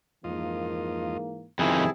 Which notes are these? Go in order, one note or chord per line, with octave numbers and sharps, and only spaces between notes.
F2 G#2 E3 A#3 F4 D#5
G1 F2 C3 D#3 E4 G#4 A5